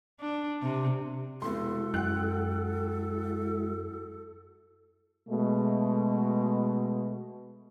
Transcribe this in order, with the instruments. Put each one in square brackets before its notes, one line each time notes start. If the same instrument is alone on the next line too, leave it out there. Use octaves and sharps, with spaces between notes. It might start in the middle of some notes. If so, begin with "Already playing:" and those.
[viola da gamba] D4
C3
[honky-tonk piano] F1 B2 C6 [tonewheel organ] G#3 E4 F#4 [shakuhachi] A4
[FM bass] F#2 [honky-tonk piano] F#5 G5 F#6
[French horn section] B2 G#3 A3